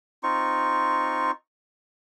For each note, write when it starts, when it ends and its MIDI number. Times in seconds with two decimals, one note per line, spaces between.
0.23 1.31 60
0.23 1.31 63
0.23 1.31 65
0.23 1.31 85